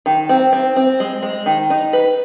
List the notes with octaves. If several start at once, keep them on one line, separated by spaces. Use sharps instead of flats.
D#3
C4
C4
C4
G#3
G#3
D#3
D#4
B4